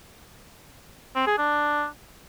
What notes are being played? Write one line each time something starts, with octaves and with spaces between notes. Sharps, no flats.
C4
G#4
D4